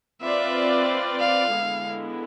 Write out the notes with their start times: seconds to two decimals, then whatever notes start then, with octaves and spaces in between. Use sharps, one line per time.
0.21 C4 F4 B4 D5 E5
1.19 F5
1.52 D3 G#3 B3 E4